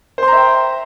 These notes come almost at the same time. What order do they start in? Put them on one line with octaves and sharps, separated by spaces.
C5 C6 A#5 E5 G5